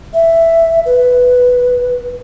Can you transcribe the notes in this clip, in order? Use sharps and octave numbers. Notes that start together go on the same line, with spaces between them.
E5
B4